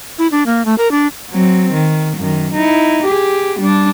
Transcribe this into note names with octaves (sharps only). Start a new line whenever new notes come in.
E4
D4
A#3
A3
A#4
D4
F#3 C4
D#3
F#2 D#3
D#4 E4
G4 G#4
G3 D4